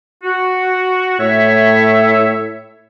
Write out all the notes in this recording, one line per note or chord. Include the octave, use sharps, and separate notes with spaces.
F#4
A2 C#5 E5